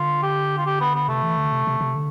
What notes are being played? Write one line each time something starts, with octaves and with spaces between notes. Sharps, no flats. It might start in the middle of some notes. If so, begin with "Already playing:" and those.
Already playing: D3 F4
G4
F4
G4
B3
B3
C3 A3
E3
D3
C3
C3
C3
D3